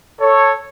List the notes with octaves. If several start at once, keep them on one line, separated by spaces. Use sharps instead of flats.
A4 C#5